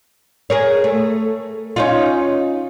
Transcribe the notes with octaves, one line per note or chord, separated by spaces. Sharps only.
G#4 A#4 C#5
A3
C#4 D#4 F4